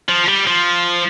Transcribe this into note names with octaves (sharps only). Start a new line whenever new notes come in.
F3
G3
F3